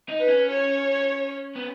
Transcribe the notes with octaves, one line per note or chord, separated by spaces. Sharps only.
D#4
B4
C#4
C#5
B3